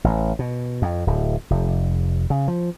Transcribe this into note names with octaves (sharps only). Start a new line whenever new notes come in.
A1
B2
F2
D1
F1
C#3
F3